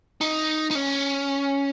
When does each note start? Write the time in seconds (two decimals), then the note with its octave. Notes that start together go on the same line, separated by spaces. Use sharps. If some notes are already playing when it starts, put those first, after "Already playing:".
0.21 D#4
0.71 D#4
0.75 C#4